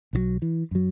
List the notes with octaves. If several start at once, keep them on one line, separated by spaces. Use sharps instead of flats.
B1 D#3 F#3
E3
F#2 F#3